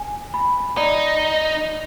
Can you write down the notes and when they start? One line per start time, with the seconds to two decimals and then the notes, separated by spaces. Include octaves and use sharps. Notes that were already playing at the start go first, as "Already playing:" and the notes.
Already playing: G#5
0.34 B5
0.77 D#4 D5